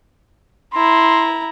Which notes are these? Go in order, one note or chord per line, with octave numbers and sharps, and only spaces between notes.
E4 A#5 C6